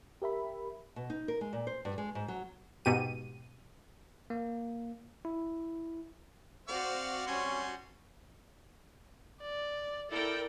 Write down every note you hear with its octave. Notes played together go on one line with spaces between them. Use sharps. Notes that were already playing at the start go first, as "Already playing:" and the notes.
G4 A#4 E5 B5
B2
D#4
A#4
G#3
A#2
C5
G2
G#3
G#2
F#3
G#2 B2 G4 D#7
A#3
E4
C4 F#4 C5 D5 F5
G3 C#4 G#5 C6
D5
E4 A4 A#4 D5 G5